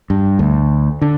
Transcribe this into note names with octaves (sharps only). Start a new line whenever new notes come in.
G2
D2
D3